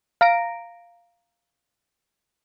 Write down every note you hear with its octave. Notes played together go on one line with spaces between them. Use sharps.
F5 A#5 A#6 D7